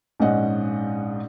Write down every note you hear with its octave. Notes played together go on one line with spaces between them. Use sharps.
A#1 G#2 C#4 D#5 F#5